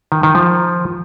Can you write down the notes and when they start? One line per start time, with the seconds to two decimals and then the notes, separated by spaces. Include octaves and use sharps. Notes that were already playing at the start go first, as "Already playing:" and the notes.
0.12 D#3
0.23 D#3
0.35 F3